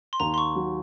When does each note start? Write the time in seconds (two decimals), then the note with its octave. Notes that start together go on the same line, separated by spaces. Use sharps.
0.13 C6
0.20 D#2 A#5
0.34 C6
0.38 C#6
0.56 F#3